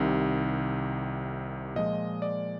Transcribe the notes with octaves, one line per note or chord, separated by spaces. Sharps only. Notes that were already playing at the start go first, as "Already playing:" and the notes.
Already playing: C2 C3 D#3
A#2 F3 G#3 D#5
D5